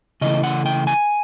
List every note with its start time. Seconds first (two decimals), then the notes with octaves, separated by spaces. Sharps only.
0.21 C#3 E3 A3 D#5
0.44 F#5
0.66 G5
0.87 G#5